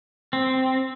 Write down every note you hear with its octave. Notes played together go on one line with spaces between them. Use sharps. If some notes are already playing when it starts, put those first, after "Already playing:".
C4